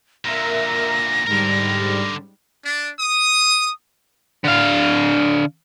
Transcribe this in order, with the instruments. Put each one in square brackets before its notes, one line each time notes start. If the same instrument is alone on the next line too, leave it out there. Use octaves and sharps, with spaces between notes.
[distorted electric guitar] A#2 D3 [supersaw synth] A#4 E5 [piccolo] A#6
[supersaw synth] G#2 G3 [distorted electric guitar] D3 A#4
[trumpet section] D4
D#6
[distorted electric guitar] D3 F5